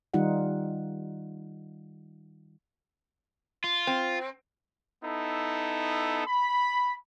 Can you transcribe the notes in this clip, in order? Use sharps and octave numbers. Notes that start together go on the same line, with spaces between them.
D#3 G3 D#4 F4 F#5
F4
C4
B3 D#4 E4 A4
B5